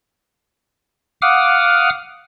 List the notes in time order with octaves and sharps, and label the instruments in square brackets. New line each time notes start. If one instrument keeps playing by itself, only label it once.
[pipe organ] F5 F#5 D6 D#6 F6